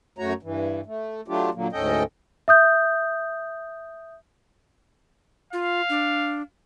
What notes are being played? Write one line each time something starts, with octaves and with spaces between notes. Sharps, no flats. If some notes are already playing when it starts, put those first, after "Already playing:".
F#2 A3 F#4 C#5 A#5
G2 E3
A3
F#3 A3 D4 F4 G4
A#2 D3 F#3 A#3
D2 G#2 C#4 A4 D#5 G5
E5 D#6 G6
F4 F5
D4